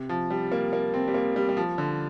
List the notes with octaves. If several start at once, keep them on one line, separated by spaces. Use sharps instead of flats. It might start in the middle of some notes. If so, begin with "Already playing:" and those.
Already playing: C3
F3
G3
A#3
A#3
C4
G3
A#3
G3
G3
F3
D3